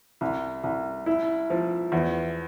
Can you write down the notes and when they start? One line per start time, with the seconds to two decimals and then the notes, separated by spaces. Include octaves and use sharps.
0.21 C2
0.63 C2
1.06 E4
1.50 F3
1.92 E2